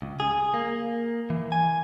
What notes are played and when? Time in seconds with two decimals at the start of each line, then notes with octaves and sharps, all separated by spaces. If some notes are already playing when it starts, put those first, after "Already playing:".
0.02 C#2
0.20 G#4
0.54 A#3
1.30 E3
1.52 G#5